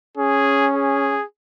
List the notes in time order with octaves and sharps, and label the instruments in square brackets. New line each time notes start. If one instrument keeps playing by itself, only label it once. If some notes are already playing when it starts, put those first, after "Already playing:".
[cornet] C#4 [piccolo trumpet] G#4
[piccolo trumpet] G#4